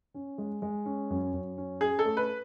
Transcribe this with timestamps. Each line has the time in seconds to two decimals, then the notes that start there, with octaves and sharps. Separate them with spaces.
0.14 C#4
0.38 G#3
0.62 G#3
0.85 C#4
1.10 F#2
1.34 F#2
1.58 C#4
1.81 C#4 G#4
1.99 A4
2.05 A3
2.17 B4